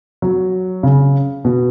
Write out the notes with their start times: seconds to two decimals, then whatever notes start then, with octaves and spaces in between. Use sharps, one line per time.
0.22 F#3
0.83 C#3
1.45 B2